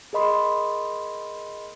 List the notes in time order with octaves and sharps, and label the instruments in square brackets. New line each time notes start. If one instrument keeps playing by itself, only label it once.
[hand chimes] G#4 A#4 D#5 B5 C6 D#6